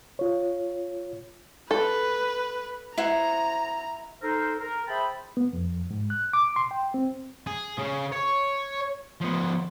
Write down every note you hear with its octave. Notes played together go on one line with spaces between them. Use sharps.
F4 C#5
A4 B4
E4 C5 F#5 A#5
D#4 A4 A#4 C5
A#4
G#4 C5 E5 G5 A5 B5
B3
F2
G#2
F#6
D6
C6
G5
C4
G#4
C#3
C#5
F3 B3